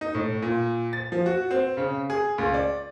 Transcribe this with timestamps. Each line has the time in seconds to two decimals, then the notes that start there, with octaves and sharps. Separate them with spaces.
0.01 D#4
0.14 A2
0.42 A#2
0.93 A6
1.12 F3
1.26 F#4
1.51 C4
1.77 C#3
2.10 G#4
2.38 C#2
2.54 D5